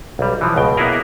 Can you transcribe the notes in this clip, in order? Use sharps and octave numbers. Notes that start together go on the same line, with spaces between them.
B1 G3
E3 F3
C#2 B2 G5
A#3 B3 E4 F#4 G#4 A#4